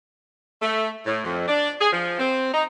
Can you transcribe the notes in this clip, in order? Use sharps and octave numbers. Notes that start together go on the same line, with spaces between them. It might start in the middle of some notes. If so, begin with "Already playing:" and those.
A3
A2
F2
D4
G#4
F3
C4
D#4